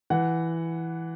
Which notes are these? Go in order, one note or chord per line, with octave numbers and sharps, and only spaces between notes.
E3 F#5